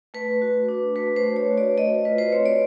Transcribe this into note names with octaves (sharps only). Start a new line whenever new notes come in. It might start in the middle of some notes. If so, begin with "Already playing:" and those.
A3 B4
F#4
D4
A3 B4
C5
A3
C#5
F#4
D5
A3 D#5
F4 B4
C5
C4 C#5
D5